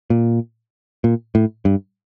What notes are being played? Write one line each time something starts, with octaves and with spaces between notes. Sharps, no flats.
A#2
A#2
A2
G2